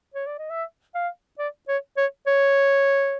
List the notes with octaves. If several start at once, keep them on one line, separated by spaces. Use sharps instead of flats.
C#5
D5
D#5
E5
F5
D5
C#5
C#5
C#5